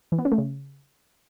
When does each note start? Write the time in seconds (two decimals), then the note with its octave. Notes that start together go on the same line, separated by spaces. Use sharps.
0.12 E3
0.19 B3
0.25 C#4
0.32 A3
0.38 C#3